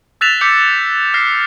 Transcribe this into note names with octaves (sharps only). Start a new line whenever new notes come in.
E6 F#6 A6 B6 E7 F7
D6 F#6 G6 B6 C#7 F7
F6 A#6 C7